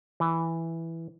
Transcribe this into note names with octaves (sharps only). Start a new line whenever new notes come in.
E3